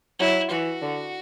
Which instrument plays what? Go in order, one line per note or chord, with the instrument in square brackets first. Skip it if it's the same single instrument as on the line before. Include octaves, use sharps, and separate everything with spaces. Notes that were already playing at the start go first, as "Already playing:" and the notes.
[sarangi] F#3 [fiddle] E4
[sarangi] E3 [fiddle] F#4
[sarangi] D3